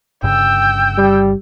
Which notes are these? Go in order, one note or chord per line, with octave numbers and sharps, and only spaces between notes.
G1 G2 C#3 G5 E6
G3